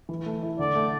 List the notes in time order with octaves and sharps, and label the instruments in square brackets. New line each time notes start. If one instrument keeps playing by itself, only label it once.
[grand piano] E3
A3
E4
[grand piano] D3 [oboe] D5
[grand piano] A3